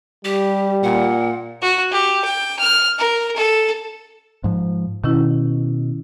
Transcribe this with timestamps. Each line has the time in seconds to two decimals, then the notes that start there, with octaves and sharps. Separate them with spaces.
0.25 G3 G4
0.83 A#2 F#5
1.62 F#4
1.92 G4
2.24 G5
2.59 F6
2.98 A#4
3.36 A4
4.44 G#2 F3
5.04 B2 D#3 C#4 E4